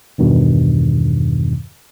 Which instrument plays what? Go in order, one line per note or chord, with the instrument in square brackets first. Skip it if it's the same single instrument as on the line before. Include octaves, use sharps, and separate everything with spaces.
[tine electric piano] E2 G2 B2 D#3